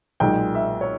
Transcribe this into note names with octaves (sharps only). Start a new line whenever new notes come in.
B1 A#2 G#3 G5
E5
C#5